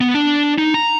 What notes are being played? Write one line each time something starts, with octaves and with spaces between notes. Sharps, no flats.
B3
D4
D#4
A#5